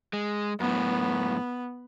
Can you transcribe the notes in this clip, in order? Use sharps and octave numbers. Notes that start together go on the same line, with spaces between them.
G#3
F#2 A2 B3